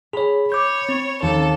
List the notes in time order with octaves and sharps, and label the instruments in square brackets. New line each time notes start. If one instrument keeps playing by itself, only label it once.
[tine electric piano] G#4 C#5 [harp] B5
[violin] C#5 [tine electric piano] D6 G6
[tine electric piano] C4
[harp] D#2 [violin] A4